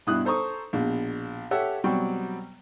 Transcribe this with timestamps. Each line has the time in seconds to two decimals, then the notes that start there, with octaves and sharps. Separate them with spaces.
0.07 G2 B2 E4 D#6 F#6
0.25 A4 C5 A#5 C#6 D#6
0.73 A#1 B2
1.51 G4 A4 C#5 E5 F#5
1.84 B2 F#3 G3 C4 G5 C#6